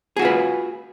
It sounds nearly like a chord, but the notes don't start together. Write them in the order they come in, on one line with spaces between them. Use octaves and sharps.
G#4 F#4 F4 B4